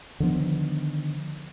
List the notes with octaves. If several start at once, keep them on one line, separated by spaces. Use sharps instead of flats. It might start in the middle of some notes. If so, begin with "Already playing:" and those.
D3 D#3 F3 B3